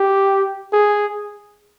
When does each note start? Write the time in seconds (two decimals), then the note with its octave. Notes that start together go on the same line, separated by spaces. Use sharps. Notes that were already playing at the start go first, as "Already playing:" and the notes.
Already playing: G4
0.73 G#4